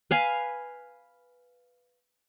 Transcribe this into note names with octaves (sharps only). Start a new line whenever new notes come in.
B4 F5 G#5